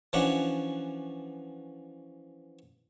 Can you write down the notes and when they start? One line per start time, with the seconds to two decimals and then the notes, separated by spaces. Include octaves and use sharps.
0.13 E3 F3 C#4 D4 F#4